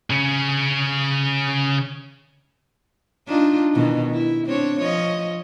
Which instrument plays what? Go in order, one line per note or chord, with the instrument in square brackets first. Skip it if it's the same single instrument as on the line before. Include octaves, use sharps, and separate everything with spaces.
[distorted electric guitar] C#3 C#4
[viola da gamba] D4 D#4 F4
B2 D#3 E3
E4
C4 D4 C#5
F3 C#5 D#5